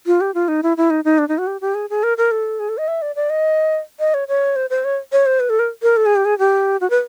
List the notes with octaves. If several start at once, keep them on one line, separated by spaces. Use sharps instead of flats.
F4
G4
F4
D#4
E4
E4
D#4
D#4
D4
D#4
F#4
G4
G4
G#4
G#4
A#4
A#4
A4
G#4
A4
D#5
E5
D5
D5
D#5
D#5
C#5
C#5
C5
C5
C#5
C#5
C5
B4
A4
A#4
A#4
A4
G#4
G4
G#4
G4
F#4
B4